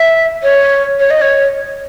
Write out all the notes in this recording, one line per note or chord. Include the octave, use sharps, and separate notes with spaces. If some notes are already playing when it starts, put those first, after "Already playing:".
Already playing: E5
C#5
C#5
D#5
C#5